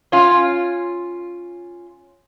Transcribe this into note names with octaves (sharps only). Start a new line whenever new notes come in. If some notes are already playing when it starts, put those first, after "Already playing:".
C#4 F4